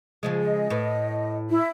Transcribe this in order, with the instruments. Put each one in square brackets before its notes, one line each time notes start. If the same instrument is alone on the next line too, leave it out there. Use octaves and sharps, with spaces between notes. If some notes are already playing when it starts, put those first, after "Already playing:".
[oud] C#3 F3 G#3
[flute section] D#5
[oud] A2 B4
[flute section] E4